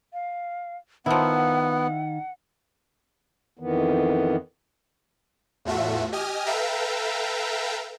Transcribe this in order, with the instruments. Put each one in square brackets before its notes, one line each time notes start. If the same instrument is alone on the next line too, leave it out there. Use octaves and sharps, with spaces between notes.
[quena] F5
[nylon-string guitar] D#3 [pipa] F3 E4 [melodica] B3 [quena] F#5
[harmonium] F2 D#3 E3 B3
[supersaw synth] E2 A2 A3 F4 F#4 E5
G4 D#5 G#5 D#6 F6
A4 B4 E5 F5 G5 A#5